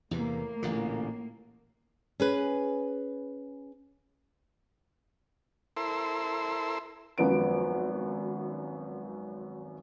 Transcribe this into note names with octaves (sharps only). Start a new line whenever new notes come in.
E2 A2 C3 E3 A#3
A1 A#2 D3
C#4 G#4 B4
E4 A4 A#4 C5 C6 E6
G#1 F#2 F3 B3 D7